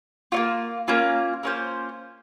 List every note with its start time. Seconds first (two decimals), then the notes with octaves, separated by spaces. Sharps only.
0.32 A#3 C#4 F4
0.88 A#3 C#4 F4
1.43 A#3 C#4 F4 C5